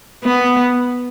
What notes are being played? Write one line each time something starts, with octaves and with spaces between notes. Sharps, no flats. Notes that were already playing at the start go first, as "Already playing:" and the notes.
B3